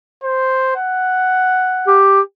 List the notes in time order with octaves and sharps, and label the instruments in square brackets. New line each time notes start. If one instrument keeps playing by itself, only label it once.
[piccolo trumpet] C5
F#5
[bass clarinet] G4